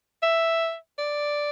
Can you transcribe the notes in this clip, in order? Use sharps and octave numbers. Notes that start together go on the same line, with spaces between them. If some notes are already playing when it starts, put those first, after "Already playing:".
E5
D5